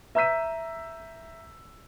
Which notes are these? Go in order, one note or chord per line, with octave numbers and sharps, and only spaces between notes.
E5 A#5 E6 G6 B6 D#7